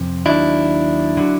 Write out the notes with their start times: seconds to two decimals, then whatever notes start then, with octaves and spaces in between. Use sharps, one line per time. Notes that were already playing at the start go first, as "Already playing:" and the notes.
Already playing: F2 C3
0.26 D#2 D#3 F#3 D4 E4
1.17 D3 F#3